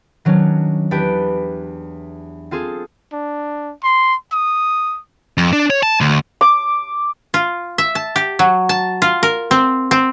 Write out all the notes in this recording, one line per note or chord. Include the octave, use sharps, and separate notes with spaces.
D#3 F#3 C#4 D4
E2 D4 G4 B4 G5 D7
C4 F4 G#4 A4
D4
C6
D#6
F2
D4
C#5
A5
D2
D6
F4
E5
A5
G4
F#3
A5
F4
A#4
C4
C4